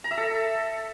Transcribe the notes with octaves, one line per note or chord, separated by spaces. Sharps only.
A#5
E5
A4